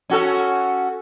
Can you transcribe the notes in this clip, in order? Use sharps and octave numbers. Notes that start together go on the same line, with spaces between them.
C#4 F#4 A4